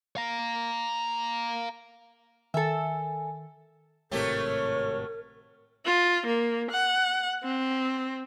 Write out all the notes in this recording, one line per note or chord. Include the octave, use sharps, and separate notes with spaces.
F5 A#5
D#3 A4 E5 G#5
G#1 A2 C3 F#3 A3 G4 A#4 C#5
F4
A#3
F#5
C4